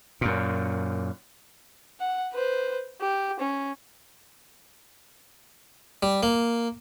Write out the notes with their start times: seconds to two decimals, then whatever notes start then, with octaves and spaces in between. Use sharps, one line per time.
0.21 F#2 A#2
2.00 F#5
2.33 B4 C5
3.01 G4
3.39 C#4
6.03 G3
6.23 A#3